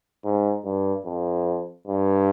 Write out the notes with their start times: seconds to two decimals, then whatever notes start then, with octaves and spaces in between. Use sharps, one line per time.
0.25 G#2
0.65 G2
1.05 F2
1.87 G2